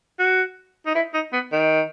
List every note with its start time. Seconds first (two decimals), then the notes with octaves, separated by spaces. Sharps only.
0.19 F#4
0.87 D#4
0.95 E4
1.14 D#4
1.33 B3
1.52 D#3